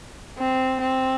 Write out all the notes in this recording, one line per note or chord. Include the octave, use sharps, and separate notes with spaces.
C4
C4